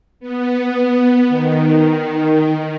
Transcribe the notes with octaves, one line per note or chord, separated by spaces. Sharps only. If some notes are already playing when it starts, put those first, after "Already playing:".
B3
D#3